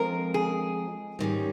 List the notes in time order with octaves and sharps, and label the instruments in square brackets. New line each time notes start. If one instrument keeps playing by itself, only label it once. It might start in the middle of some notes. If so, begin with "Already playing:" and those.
Already playing: [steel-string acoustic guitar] F3 G#3 C4 F4 [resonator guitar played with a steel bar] A#4
[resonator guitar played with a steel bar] G#4
[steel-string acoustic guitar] G#2 D#3 G3 C#4